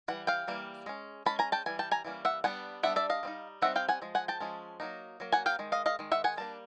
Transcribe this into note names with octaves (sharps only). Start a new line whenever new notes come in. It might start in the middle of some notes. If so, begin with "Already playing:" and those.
E3 G3 F#5
F5 G5
E3 G3 A#3
G#3 C#4
G#3 C#4 A5 B5
G#5 A#5
G5 A5
E3 G3 G#5
G5 A5
G#5 A#5
E3 G3 A#3 C#4
E5 F#5
G3 B3 D4 F#5 G#5
G3 B3 D4 E5 F#5
D5 E5
D#5 F5
G3 C4 D#4
G3 C4 D#4 E5 F#5
F5 G5
F#5 G#5
F3 G#3
F#5 G#5
G5 A5
F3 G#3 C#4
F#3 A#3 D#4
F#3 A#3
F#5 G#5
F5 G5
D#3 G#3
D#5 F5
D#5 F5
D#3 G#3
E5 F#5
F#5 G#5
G3 A#3 D4 A5